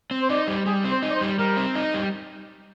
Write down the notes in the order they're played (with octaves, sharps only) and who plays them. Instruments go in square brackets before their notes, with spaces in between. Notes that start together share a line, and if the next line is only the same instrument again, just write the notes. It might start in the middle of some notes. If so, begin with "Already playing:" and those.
[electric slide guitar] C4
[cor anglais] C5
[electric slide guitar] D#4 [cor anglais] D5
[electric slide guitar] G3
[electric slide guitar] G3 [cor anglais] G#4
[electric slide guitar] C4
[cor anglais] C5
[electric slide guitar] D#4
[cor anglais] D5
C5
[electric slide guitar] G3
[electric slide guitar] G3 [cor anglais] A#4
[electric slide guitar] C4
D#4
G3